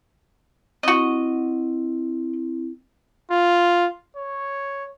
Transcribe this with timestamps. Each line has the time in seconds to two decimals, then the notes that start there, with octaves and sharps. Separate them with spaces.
0.83 C4 E4 F#4 D#5
3.31 F4
4.17 C#5